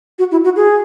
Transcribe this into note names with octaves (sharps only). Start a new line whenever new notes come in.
F#4
E4
F#4
G#4